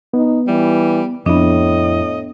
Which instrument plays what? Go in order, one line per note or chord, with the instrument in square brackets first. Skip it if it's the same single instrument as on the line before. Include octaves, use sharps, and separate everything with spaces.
[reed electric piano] B3 [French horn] D#4
[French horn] E3 [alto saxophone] G3
[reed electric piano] F2 E4 [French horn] A2 [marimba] B3 D4 [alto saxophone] D#5